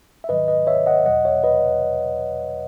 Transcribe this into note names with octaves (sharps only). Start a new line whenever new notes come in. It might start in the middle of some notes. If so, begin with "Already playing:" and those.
E5
G#2 D#3 F#3 B4 D#5
B4 D#5
C#5 E5
D#5 F#5
E2 B2 F#3 D#5 F#5
C#5 E5
B4 D#5